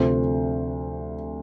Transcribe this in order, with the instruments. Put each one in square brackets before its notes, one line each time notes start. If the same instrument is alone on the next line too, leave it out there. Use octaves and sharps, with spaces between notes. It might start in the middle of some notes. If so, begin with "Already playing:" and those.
Already playing: [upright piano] D2 C3 F3 C5